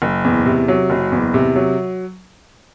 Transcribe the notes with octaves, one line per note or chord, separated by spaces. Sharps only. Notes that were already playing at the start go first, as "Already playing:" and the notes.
F#1
E2
C3
F#3
F#1
E2
C3
F#3